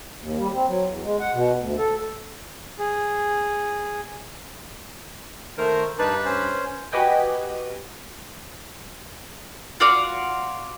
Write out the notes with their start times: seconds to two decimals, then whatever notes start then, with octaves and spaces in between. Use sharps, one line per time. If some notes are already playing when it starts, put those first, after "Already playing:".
0.21 D#2
0.39 G3
0.53 C4
0.67 F#3
0.85 E2
1.02 G#3
1.20 F#5
1.33 B2
1.59 D2
1.78 A4
2.79 G#4
5.58 D#3 A3 A#4 C5
5.99 G2 D4 D#4 B4 A5
6.25 C#4 C5
6.92 F#4 G4 B4 D#5 G5 G#5
9.80 F4 F#4 D5 F5